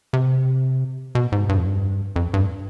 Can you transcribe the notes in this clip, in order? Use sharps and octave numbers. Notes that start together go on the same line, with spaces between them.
C3
B2
G#2
G2
F2
G2
F2
G2